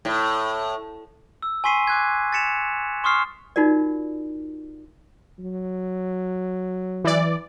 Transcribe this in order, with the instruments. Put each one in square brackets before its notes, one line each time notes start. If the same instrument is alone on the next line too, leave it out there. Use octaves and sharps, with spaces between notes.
[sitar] A2
[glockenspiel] E6
G#5 C6 C#6 B6 C7 D#7
D6 F#6 G#6
A6 B6 C#7 E7 F7
C6 C#6 D#6 F6 C7
[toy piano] D#4 F4 F#4 A#4 D5
[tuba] F#3
[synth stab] E3 D5